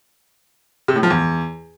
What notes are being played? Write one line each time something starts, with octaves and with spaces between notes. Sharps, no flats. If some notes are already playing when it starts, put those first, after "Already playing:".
C3
A2
F3
E2